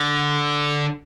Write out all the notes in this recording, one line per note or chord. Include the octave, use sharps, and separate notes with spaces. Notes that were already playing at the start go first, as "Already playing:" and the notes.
Already playing: D3